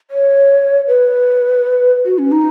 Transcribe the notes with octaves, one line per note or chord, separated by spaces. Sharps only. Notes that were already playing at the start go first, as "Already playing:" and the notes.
C#5
B4
F#4
C#4
D#4